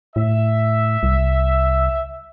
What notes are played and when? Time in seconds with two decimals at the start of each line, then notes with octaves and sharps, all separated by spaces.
0.16 A2 E5
1.03 C2